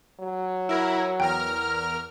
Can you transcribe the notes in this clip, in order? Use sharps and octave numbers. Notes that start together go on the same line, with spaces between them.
F#3
E4 A#4
E2 A#4 G5 F6